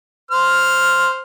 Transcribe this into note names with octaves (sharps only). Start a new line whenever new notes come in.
C5 F6